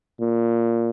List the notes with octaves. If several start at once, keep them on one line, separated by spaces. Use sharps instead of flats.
A#2